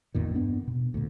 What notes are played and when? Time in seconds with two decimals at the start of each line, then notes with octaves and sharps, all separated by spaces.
0.15 A1 E2 A#2 D#3
0.34 G2 B3 D4
0.67 B2
0.94 D2 A#2